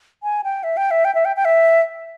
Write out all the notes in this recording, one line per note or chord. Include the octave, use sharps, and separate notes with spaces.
G#5
G5
E5
G5
E5
G5
E5
G5
G5
E5